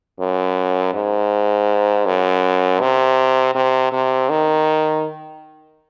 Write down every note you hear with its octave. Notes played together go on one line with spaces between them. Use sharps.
F#2
G#2
F#2
C3
C3
C3
D#3